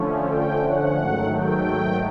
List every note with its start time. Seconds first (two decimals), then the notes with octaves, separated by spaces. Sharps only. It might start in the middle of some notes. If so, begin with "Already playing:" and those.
Already playing: D3 F3 A3 C#4
0.28 G5
0.63 F#5
0.98 G#2 D#3 F#3 A3
1.33 G5